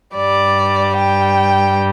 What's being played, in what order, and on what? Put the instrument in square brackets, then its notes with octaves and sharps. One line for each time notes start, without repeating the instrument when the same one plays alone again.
[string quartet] G2 G3 D5
G5